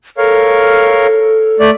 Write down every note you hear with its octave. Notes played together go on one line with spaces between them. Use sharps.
A4 A#4 C#5 F5
A3 D5